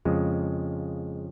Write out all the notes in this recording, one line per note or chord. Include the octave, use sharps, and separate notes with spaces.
F2 C#3 F3 G#3